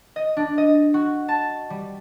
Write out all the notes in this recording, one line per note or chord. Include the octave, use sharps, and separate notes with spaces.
D#5
D4
D#5
F#4
A5
G3